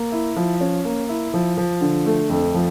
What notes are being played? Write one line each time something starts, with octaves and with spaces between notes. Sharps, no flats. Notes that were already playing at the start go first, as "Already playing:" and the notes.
Already playing: A#3
E4
F3
C#4
A#3
E4
F3
F3
D3
A3
F2
F3